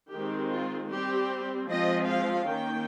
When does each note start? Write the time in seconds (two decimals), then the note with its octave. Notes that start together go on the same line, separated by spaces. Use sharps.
0.11 D#3 G#3 C4 G4
0.50 F4
0.89 G3 C4 G4
1.68 F3 G#3 C4 D#5
2.07 F5
2.47 D#3 A#3 C#4 G5